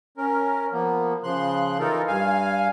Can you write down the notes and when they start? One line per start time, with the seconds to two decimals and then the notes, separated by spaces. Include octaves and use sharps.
0.17 C#4 A#4
0.73 F3 A#3 B3
1.24 C#3 F3 C6 F#6
1.80 E3 D#4 F4 A4 A#4
2.07 G2 F5 G#5